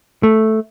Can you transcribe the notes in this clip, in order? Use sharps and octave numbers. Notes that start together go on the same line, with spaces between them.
A3